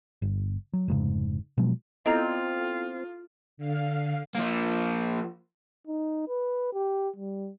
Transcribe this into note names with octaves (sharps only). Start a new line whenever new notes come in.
G1
F#3
F1 G#2 C#3
B2 F3 F#3 G#3
B3 C4 E4 F4 A4 D#5 A#5
D3 F5
F3 A#3
D#4
B4
G4
G3